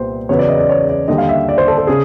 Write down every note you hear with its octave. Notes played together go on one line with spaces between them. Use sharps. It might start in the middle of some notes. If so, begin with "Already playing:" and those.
Already playing: C2 A#2 G3 B3 C5
E2 C#3 F#3 B3 C#5
D5
D#5
D5
C#5
D5
D#2 D3 G3 D#5
F5
E5
D5
C5
A4
A4
C#3 G#4